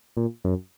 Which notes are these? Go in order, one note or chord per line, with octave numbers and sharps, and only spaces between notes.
A#2
F#2